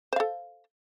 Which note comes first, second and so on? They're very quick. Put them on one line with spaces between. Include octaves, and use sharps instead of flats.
C5 F5 A4